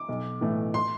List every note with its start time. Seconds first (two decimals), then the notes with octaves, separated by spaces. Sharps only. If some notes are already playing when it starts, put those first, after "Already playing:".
Already playing: D6
0.09 B1
0.41 A2 E3 A3
0.74 C6